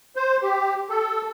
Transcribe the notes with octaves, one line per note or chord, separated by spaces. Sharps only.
C5
G4
A4